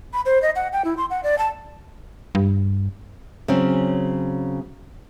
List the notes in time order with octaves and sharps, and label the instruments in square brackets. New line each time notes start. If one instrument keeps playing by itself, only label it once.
[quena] B5
C5
D#5
F#5
G5
E4
C6
F#5
D5
A5
[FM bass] G2
[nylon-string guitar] C#3 F#3 C4 C#4